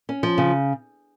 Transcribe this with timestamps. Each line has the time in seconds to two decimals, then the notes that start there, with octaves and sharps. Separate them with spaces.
0.09 C#4
0.23 F3
0.38 C#3